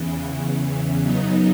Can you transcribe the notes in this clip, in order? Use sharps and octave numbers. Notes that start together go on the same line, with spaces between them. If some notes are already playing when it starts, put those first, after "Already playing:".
Already playing: E2 C#3 E3
F#2 C#3 F#3 B3 D#4